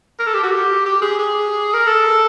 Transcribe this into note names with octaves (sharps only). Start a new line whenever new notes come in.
A#4
A4
G4
F#4
G4
G4
G#4
G#4
A#4
A4